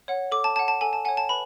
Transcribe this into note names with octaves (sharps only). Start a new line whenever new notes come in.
C#5 F#5
A4 D6
A5
C#5 F#5 A5
A5
A4 G#5
A5
C#5 F#5 G#5
A5
B4 B5